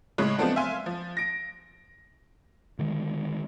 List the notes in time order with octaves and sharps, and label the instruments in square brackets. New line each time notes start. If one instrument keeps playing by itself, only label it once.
[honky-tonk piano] A2 C#3 G#3 C#5 F#6
F3 G#3 A3 B3 C4 D4
E5 F5 G#5 C6
F3
A#6 D7
[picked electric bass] D3 D#3 G#3